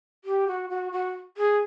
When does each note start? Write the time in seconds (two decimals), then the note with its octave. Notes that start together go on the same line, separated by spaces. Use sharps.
0.24 G4
0.47 F#4
0.70 F#4
0.92 F#4
1.37 G#4